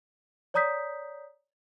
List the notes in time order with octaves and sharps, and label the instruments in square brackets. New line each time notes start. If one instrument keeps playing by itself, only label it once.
[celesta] C#5 D5 A#5 D#6 G6 B6